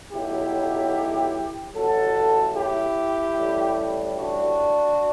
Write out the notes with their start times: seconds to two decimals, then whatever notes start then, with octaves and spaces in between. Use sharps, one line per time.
0.12 B1 A2 F#3 E4 G4
1.75 A1 A2 F#3 F#4 A4
2.56 E4 G4
3.37 A1 A2 G3
4.17 D4 F#4